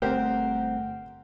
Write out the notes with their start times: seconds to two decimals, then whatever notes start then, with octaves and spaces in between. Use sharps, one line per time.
0.02 G1 A3 C4 G4 A#4 C5 F#5